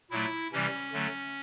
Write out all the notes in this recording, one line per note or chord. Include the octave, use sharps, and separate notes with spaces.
A#2 F#3 A3 E4
C3 E3 G3 C#4
D3 F#3 A3